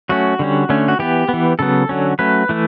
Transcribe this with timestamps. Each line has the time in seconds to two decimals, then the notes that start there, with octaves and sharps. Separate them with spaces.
0.09 F#3 A3 C#4 F#4
0.39 D3 G3 C#4
0.69 D3 A3 C#4
0.88 F#4
0.99 E3 B3 G4
1.29 E3 B3
1.59 C#3 F#3 B3 A4
1.89 D3 F#3 C#4
2.19 F#3 A3 C#4 B4
2.49 E3 A3